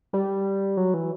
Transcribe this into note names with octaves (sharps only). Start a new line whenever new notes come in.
G3
F#3
E3